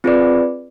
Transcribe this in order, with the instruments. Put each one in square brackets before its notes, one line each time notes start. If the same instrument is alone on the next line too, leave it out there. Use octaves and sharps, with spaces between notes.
[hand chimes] C4 F4 G#4 B4 D5